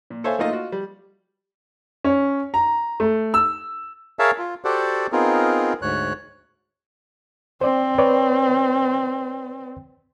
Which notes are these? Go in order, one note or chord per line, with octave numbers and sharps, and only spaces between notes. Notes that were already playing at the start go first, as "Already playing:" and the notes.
A#2
A4 C5 C#5 E5 F5 G#5
A3 A#3 D#4 F4 A4 D#5
F4 F#4
G3
C#4
A#5
A3
E6
G#4 A#4 C#5 E5 F5 A5
F4
F#4 G4 A4 C5 D5 F#5
B3 C4 D#4 F4 G#4 A#4
D2 G#2 C#5 F#6
C4 C5 D5
B4 C#5 D5